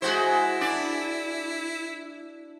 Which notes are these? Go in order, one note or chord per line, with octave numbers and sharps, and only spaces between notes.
G#3 E4 F#4 C5
D4 D5